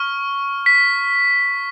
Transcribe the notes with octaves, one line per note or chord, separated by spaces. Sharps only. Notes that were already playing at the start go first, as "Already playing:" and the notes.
Already playing: C#6 F6
B6